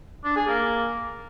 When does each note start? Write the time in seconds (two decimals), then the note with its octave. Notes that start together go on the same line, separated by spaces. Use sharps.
0.25 D4
0.36 G#4
0.48 A#3